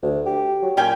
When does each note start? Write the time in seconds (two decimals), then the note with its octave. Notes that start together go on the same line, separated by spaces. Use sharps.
0.03 D2
0.26 G4
0.62 F#3
0.77 A#2 C#4 G5 G#5